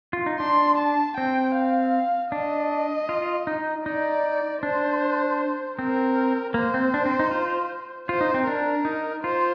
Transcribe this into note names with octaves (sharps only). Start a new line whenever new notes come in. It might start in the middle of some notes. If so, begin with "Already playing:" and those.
F4
D#4
D4 C6
A5
C4 G5
F5
D4 D#5
F4
D#4
D#4 D5
D4 C5
C4 A#4
A#3 C5
C4
D4
C4
D#4
F4
F4 C5
D#4
C4
D4 A#4
D#4
F4 C5